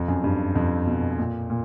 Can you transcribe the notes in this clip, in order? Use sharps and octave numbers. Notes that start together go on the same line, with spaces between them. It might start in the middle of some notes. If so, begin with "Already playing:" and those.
Already playing: F2
F#2
G2
F2
B2
A#2
A#2